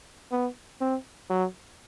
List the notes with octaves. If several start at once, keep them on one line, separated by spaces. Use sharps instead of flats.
B3
C4
F#3